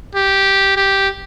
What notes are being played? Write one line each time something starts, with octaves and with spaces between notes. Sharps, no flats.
G4
G4